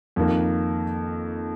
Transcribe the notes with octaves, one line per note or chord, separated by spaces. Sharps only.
F2 D#3 A#3